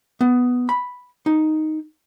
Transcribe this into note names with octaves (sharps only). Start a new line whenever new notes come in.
B3
B5
D#4